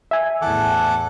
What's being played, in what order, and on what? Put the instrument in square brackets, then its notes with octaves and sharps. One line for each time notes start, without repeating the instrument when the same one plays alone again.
[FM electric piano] E5 G#5
[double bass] E2 A2 [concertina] A4 F#5 D6